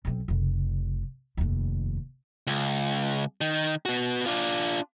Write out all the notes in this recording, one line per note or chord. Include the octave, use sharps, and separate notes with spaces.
B1 C4
F1 C#3
F1 D#2
C#2
D#3
B3 F#4
D4 F4